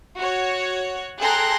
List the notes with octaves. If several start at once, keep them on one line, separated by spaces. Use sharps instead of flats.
F#4 C#5
G#4 A4 G5 A#5 C6 F#6